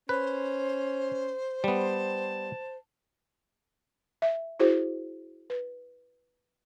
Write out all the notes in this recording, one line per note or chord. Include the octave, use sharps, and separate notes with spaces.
C#4 B4 C5
G3 B3 A5
E5
E4 F#4 G#4 C5
B4